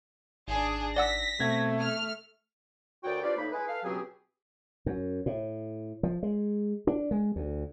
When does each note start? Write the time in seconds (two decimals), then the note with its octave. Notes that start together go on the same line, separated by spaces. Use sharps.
0.48 G#1 D4 G#4
0.96 D5 F#5 E6 A#6 B6
1.40 B2 A3 C4 G#6
1.80 F6
3.04 D2 A#3 F#4 C#5 D5 G5
3.22 D4 F4 G4 B4 C5 D5
3.37 A2 A#3 D#4 B5
3.52 G#3 E4 B4
3.67 A4 B4 F5
3.83 C#2 B2 F#3 C4 G4 G#4
4.86 F#2
5.26 A2
6.03 F3
6.23 G#3
6.87 D4
7.11 G#3
7.36 D2